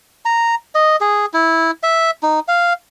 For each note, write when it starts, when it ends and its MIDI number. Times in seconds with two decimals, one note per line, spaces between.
0.25 0.55 82
0.75 0.96 75
1.01 1.26 68
1.34 1.71 64
1.83 2.11 76
2.23 2.40 63
2.48 2.73 77